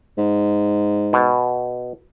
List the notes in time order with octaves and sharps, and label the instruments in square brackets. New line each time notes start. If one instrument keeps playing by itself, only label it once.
[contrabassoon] G#2
[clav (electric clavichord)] B2